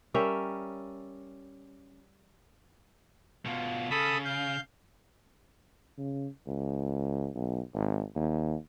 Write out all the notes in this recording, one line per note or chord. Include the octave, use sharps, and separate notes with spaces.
G3 C#4 A#4 E5
B2 F4
C#3 A4 B5 D#6
F5 G6
C#3
C#2
B1
G#1
D#2